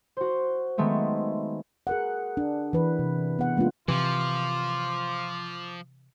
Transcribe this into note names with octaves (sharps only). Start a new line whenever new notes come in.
F#4 C5
D#3 G#3 A3 B3 C4
G#4 A#4 F#5
D4
E3 B4
C3
B3 F#5
G#3 A#3 B3 C#4 D4 F4
C3 E3 F3 F4 D6